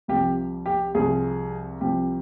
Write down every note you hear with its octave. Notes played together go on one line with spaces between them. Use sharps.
C2 C3 F3 G4
G4
C2 C3 F3 G#4
C2 C3 F3 G4